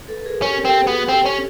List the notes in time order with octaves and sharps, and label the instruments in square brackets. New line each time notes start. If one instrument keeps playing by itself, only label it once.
[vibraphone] A4 B4
B4
G#4 A#4
[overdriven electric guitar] C#4 [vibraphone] G4 A4
[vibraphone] A#4
[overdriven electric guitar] C4 [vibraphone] G4 A4
[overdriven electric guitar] B3 [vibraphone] F#4 G#4
[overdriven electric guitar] C4 [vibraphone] G4 A4
[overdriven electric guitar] C#4